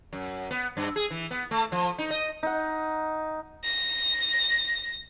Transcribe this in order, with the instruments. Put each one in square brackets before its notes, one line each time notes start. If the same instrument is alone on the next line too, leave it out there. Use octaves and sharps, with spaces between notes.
[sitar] F#2
B3
G2
G#4
E3
B3
A3
F3
D#4
D#5
[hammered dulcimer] D#4 F#5
[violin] A#6